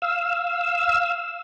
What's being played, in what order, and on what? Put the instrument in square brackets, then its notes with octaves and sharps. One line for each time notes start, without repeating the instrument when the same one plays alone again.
[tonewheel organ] F5 E6